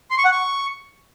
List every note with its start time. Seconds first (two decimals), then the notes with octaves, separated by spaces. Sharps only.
0.11 C6
0.18 C#6
0.25 F#5
0.32 C#6